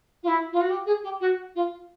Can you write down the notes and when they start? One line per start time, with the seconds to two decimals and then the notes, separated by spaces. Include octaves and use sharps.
0.23 F4
0.27 E4
0.52 F4
0.61 F#4
0.70 G4
0.86 G#4
1.03 G4
1.20 F#4
1.55 F4